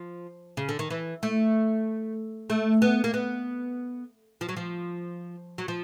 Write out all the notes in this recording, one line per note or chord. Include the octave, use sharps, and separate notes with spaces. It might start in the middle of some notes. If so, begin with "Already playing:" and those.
Already playing: F3
C#3
D3
D#3
E3
A3
A3
B3
A#3
B3
F3
F#3
F3
F#3
F3